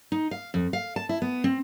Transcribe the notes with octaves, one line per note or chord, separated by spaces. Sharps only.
D#4
F5
F2
F5
A5
E4
B3
C4